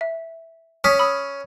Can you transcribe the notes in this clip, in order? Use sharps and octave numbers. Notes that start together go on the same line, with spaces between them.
E5
C#4 D#6 B6
B5 D#6 E6